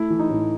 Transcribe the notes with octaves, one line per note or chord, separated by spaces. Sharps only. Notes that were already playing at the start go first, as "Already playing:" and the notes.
Already playing: A3 E4
E3
D#4
A2